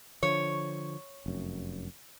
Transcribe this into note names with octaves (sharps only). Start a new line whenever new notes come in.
D3 F3 C#5
F1 F#2